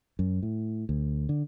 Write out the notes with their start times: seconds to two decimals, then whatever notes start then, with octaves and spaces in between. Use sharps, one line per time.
0.19 F#2
0.43 A2
0.89 D2
1.29 D3